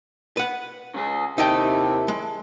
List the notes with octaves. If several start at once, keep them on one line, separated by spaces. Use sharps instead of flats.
B4 F#5
C#3 G#3 G#4
D#2 C3 D#4 E4 D#5 E5 G5 A5
G#3